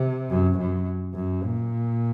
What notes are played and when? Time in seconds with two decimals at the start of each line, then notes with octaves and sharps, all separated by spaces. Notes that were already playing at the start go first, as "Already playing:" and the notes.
Already playing: C3
0.30 F#2
0.58 F#2
1.15 F#2
1.43 A#2